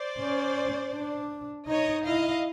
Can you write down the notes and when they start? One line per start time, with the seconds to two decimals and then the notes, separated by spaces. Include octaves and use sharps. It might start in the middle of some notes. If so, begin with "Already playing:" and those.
Already playing: C5 D5
0.18 C#4
0.93 D4
1.68 D#4 C#5 D#5
2.06 E4 D#5 F5